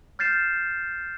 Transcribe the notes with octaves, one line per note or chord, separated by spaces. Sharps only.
F6 G6 A6 C7 E7